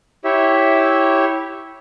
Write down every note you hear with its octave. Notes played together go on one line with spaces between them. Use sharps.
E4 G4 C#5 E5